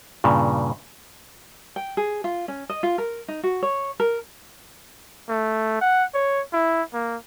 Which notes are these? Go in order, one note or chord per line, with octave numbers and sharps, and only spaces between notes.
G2 A#2 C#3
G5
G#4
F4
C#4
D#5
F4
A#4
D#4
F#4
C#5
A#4
A3
F#5
C#5
E4
A#3